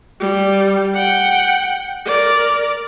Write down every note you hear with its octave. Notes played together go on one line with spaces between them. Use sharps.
G3
F#5 G5
A#4 D5